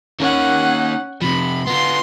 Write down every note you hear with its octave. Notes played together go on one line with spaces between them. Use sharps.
D#3 A#3 C#4 F#5
C3 F3 B5
B3 F4 C6